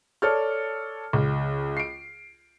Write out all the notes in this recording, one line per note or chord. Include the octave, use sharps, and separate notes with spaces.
A4 C#5 D5 F6
C#2
C7 D7